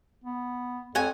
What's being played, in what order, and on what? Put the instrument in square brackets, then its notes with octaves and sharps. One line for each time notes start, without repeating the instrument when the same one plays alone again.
[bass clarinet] B3
[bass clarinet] F2 [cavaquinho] C#5 F#5 G#5